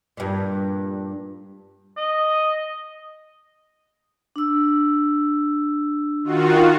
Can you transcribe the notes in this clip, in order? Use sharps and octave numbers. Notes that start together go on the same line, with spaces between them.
G2 A#2
D#5
D4 E6
D#3 F4 F#4